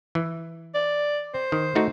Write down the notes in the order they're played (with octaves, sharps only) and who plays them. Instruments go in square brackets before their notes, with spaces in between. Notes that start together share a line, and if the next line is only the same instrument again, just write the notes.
[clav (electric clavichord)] E3
[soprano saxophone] D5
C5
[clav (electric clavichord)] D#3
A3 D#4 F#4